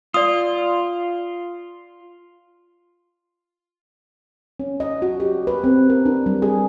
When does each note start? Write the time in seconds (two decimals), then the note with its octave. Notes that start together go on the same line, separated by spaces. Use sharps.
0.14 F4 D5 D#6
4.60 C#4
4.80 D#5
5.02 F#4
5.20 G4
5.47 B4
5.64 C4
5.90 A#4
6.06 D4
6.26 G3
6.42 G#4